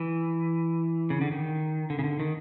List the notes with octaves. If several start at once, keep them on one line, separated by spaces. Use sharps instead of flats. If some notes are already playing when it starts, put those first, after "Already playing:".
Already playing: E3
C#3
D3
D#3
D3
C#3
D3
D#3